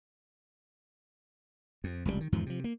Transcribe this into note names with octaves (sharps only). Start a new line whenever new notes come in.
F2
F1 C#2 G#2 G3
D#3
E2 G#2 D#3 F3
C3 F3
A#3